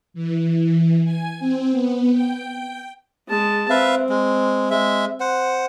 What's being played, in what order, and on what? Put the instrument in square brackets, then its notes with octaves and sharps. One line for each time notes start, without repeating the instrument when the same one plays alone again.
[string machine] E3
G#5
C4
B3
G5
[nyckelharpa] G#3 A5
[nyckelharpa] C4 [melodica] B4 E5 F5
[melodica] G#3
G#3 E5
C5 F#5